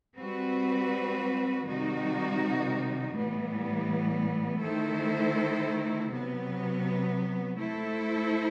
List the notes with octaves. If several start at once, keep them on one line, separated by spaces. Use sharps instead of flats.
G3 C4 F#4 B4
C3 D#3 G3 D#4 F#4
A2 E3 G3 B3
D#3 A3 E4 A4 C5
C3 F#3 B3
A3 E4 A4 C5